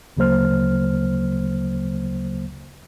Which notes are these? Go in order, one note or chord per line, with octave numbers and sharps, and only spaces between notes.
D2 C#3 F#3 A#3 C5 F6